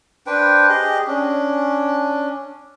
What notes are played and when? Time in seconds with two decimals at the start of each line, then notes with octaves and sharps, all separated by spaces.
0.27 D4 B4 C5 G5
0.69 G4 G#4 D#5
1.07 C#4 D4